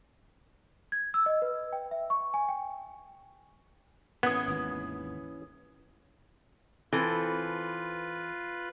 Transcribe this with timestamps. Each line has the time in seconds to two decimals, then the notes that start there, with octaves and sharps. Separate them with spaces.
0.92 G#6
1.14 E6
1.26 D#5
1.42 B4
1.73 G5
1.91 E5
2.10 C#6
2.34 G#5
2.48 G5
4.23 A2 E3 B3 C#4 D#6 G#6
4.48 G#1 D#2
6.93 E3 C4 F4 A4 B4